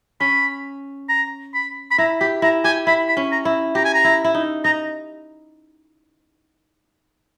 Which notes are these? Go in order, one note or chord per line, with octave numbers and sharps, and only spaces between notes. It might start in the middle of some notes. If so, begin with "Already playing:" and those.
C#4 B5
A#5
B5
B5
E4 A#5
G4 B5
E4 A#5
G4 G#5
E4 B5
B5
C#4
A#5
E4
G4 A#5
G#5
A#5
E4
E4
D#4
D#4 A#5